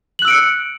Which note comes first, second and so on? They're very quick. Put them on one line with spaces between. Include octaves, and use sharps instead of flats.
F#7 F#6 E6 D7 C#7